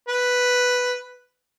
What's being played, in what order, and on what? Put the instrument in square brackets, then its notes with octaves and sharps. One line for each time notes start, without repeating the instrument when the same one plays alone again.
[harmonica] B4